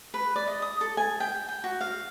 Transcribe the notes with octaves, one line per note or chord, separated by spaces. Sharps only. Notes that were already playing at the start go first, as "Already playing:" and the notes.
B4
D5
D#5
D#6
A4
G#5
G5
G5
F#4
F5